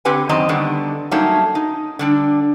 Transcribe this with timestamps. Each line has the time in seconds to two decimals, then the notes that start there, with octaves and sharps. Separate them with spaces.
0.05 D3 C4 G4 B4 F#5 G#5
0.29 F#2 D#3 C4 D#5 A#5
0.49 D3 D#3 G3 B3
1.11 F#3 G3 A3 A#3 C#4 D#4
1.55 D#4
1.99 D3 G3 D4